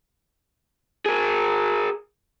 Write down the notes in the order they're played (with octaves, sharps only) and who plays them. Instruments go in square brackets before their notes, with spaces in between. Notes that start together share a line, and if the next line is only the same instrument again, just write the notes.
[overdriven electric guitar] G#4 A#4